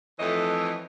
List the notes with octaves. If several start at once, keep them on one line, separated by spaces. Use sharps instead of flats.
F2 E3 A3 C#5 D#5